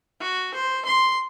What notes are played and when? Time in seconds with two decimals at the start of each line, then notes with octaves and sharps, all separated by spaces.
0.20 F#4
0.54 C5
0.85 C6